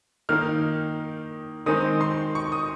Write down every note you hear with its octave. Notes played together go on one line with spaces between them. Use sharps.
D#3 A#3 D#4 F6
D#3 G#3 C4 D#4 D#6
C6
C#6
D#6